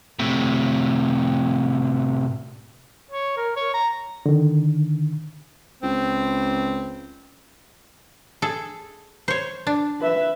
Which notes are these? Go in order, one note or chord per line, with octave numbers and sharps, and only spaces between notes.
A2 C3
C#5
A#4
C#5
A#5
D3 D#3
C#2 C4
G#4 A4
C5 C#5
D4
B4 E5